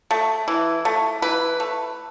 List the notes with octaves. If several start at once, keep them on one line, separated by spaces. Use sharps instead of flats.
A3
E3
A3
E3 B4
A3